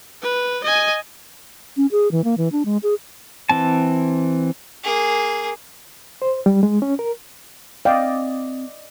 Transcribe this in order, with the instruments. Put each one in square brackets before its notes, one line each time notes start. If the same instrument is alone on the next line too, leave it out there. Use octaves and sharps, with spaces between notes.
[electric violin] B4
D#5 G#5
[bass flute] C#4
G#4
E3
A#3
E3
D4
G#3
G#4
[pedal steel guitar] E3 C4 A5
[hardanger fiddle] A#3 G#4
[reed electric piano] C5
G3
G#3
C#4
A#4
[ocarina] C4 [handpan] D5 D#5 [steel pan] F5 G5